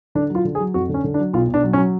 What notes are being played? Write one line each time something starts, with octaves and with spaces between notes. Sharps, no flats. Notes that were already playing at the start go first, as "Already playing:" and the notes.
D3 D4
F#3 F4
D3
G#4
F#3
F2 F#4
D3
C#4
D3
D4
F#3
B1 F4
B1
D4
F#3
C#4
F#3